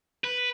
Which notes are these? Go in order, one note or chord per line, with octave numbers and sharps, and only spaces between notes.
B4